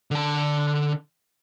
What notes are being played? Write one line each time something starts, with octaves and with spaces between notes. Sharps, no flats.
D3 A5